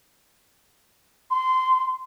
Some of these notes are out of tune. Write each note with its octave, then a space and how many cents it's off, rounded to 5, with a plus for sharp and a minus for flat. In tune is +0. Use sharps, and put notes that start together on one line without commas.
C6 -20